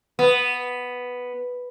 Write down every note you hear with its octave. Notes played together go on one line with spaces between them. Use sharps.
B3